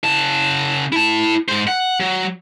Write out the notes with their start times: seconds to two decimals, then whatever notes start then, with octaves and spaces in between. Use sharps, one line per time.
0.04 C#3 A5
0.93 E4 A5
1.49 G#2 C5
1.68 F#5
2.00 F#3